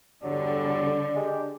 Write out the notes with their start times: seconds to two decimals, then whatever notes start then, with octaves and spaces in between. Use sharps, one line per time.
0.23 E2 G2 D3 F#3 G3 D5
1.16 G#3 D4 G4